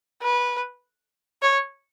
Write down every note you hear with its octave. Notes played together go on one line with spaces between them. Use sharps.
B4
C#5